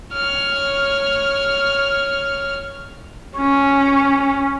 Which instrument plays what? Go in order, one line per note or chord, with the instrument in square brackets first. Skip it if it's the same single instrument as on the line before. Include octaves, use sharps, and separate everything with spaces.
[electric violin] C#5 F6
[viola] C#4